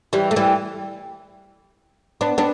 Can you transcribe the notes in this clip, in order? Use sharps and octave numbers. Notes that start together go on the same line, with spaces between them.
E3 G3
A3
E3 G3
B3 D4
B3 D4